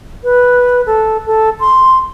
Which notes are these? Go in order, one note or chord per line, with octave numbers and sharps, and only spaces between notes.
B4
A4
A4
C6